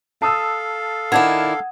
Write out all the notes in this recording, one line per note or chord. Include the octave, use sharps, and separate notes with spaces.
A4 F5 A5 D#6 E6
D#3 D4 E4 F#5 G#6